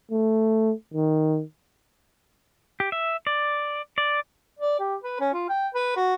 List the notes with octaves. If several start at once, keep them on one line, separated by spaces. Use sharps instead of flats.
A3
D#3
G4
E5
D5
D5
D5
G4
B4
C#4
F4
G5
B4
F#4